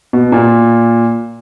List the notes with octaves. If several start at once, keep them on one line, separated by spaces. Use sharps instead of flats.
B2
A#2